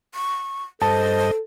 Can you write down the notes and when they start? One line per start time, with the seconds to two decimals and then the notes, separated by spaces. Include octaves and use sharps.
0.14 C#6
0.82 G2 A4 C5 D#5 A5